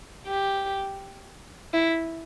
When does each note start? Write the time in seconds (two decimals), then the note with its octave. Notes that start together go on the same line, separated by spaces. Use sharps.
0.27 G4
1.74 E4